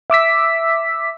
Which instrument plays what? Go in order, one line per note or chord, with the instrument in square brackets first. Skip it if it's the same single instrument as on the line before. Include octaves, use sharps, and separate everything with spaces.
[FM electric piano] E5 D6 E6 B6